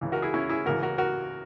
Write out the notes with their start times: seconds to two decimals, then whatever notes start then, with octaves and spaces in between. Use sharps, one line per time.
0.01 C#2 C#3 E3
0.12 F#4 A#4
0.22 E4 G#4
0.34 C#4 E4
0.49 E4 G#4
0.66 C#2 C#3 E3 F#4 A#4
0.83 F#4 A#4
0.98 F#4 A#4